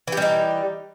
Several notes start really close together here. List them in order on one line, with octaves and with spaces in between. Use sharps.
E3 G4 G3 D#4